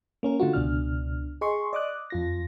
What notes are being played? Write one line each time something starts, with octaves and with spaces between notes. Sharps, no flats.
A#3 C#4 A#4
D3 A3 F4 F#4
C#2 B2 D4 F6
G#4 D#5 C6 C#6
D5 D#5 D6 D#6 F#6
F2 F4 A#6